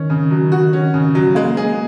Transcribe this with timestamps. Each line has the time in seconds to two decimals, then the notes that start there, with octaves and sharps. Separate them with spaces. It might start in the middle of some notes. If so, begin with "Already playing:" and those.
Already playing: D#3 C#4
0.10 C#3
0.31 F#3
0.52 F#4
0.73 C#4
0.94 C#3
1.15 F#3
1.35 G#3 A#3
1.57 G#4